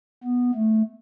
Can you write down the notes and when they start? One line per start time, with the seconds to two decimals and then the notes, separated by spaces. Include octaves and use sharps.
0.24 B3
0.55 A3